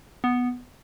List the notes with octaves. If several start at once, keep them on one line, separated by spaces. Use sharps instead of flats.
B3